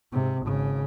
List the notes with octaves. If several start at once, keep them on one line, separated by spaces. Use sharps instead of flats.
G#2 C3
G#1 C#3